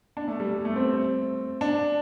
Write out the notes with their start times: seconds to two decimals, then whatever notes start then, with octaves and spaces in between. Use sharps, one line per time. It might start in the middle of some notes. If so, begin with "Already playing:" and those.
0.17 D4
0.28 A3
0.40 G3
0.53 G3
0.65 A3
0.76 C4
1.61 D4